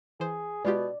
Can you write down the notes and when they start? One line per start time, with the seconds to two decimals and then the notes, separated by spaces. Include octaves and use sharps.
0.20 E3 G#4 C5
0.65 B2 G#3 F4 G4 D5